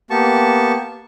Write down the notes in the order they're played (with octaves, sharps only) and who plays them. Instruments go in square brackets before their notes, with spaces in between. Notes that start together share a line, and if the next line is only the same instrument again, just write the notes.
[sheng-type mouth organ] A#3 B3 G4 A5 C#6